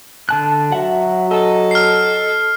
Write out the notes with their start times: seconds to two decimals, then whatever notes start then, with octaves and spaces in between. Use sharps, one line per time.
0.29 D3 A5 F#6
0.72 F#3 F#4 E5 F#5
1.31 A4 D#5
1.71 F6 C7